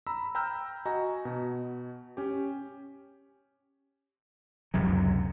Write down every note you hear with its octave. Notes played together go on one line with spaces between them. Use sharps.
A#5 B5 E6
G5 A#5 B5 E6 F6 G6
F#4 D#5 G#5 A#5
B2
C#4 G4
C#2 F#2 C3 F#3